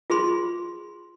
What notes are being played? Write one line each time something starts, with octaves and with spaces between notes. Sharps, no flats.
F4 G#4 B5 C6